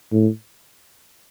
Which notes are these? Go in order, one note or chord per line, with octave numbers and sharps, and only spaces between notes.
A2